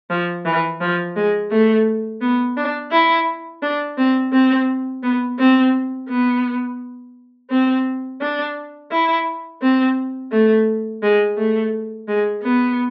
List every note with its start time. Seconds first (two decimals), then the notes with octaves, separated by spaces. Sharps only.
0.10 F3
0.46 E3
0.81 F3
1.16 G#3
1.51 A3
2.21 B3
2.57 D4
2.92 E4
3.63 D4
3.98 C4
4.33 C4
5.03 B3
5.39 C4
6.09 B3
7.50 C4
8.21 D4
8.91 E4
9.62 C4
10.32 A3
11.03 G#3
11.38 A3
12.08 G#3
12.43 B3